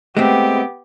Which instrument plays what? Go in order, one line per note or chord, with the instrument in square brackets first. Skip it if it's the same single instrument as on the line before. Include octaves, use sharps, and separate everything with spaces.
[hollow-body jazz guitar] G#3 A3 C4 [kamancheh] B3 G4